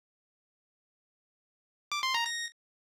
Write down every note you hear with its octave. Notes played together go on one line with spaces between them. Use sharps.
D6
C6
A#5
A#6